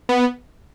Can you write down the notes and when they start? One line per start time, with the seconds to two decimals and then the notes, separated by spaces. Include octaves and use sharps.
0.09 B3